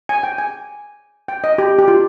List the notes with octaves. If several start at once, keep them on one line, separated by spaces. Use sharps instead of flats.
G#5
G5
G#5
G5
D#5
G4
G4
F4